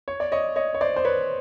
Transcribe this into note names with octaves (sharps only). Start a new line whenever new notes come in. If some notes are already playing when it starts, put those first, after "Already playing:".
C#5
D5
C#5 D#5
C#5 D#5
C#5
C5 D5
C5
B4 C#5